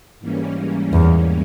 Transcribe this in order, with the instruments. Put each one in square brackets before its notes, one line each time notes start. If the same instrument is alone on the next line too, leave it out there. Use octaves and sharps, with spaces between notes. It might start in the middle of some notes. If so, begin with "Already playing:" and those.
[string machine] G#2 E3 G3 A#3 C#4
[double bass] E2